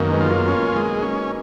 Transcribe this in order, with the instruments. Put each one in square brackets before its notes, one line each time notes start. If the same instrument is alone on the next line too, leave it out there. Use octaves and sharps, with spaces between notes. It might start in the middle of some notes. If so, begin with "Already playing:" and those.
Already playing: [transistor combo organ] F#2 D#3 [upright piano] A#3 B3 C#4 D#4
[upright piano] G#3 B3
[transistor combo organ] F4
[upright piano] F#3 A#3
[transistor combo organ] C#4
G#3
C#4